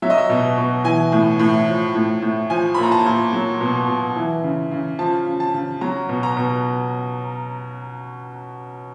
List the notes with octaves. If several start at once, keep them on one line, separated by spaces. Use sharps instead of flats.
F#3 E5
D#5
E5
B2
B2
E3 G#5
A2
A2
F3
A2
A2
F3 G#5
A#2 B5
A#5
A5
A#2
F#3
B2
B2
E3
C#3
C#3
F3 A5
C#3
A5
C#3
F#3 A#5
B2
A#5
B2